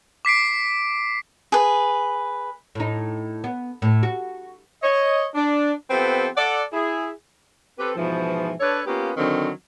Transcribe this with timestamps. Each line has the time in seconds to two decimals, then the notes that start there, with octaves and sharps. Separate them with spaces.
0.25 D6 B6 C7 D7
1.52 G#4 B4
2.75 A2 D#4
3.44 B3
3.82 A2
4.03 F#4
4.83 C#5 D#5
5.35 D4
5.90 F3 B3 C4 G4 A4 B4
6.37 A4 D5 F#5
6.73 E4 G#4
7.78 C4 G4 A4 B4
7.96 G#2 B2 E3 F3
8.61 D4 A4 B4 C#5
8.87 A#3 B3 C#4 F4 G4
9.17 D3 D#3 F#3 C4